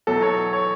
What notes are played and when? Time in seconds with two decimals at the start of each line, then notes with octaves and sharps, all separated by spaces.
0.07 E2 B2 F#3 A4
0.22 C#5
0.53 C#5